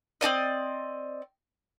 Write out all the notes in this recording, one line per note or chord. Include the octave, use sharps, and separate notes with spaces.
C4 D#4 D5 D#5